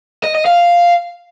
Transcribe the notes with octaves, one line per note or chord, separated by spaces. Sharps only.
D#5
D#5
F5